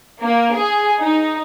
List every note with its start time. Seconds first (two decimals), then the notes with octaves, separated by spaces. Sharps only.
0.21 A#3
0.55 G#4
1.01 D#4